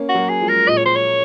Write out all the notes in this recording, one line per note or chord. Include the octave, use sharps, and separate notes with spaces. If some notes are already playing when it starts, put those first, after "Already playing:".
Already playing: A#3 C#4
F#4
F#3 A#3
G#4
F3 G#3
A#4
A#2 D#5
C#5
C5
C#5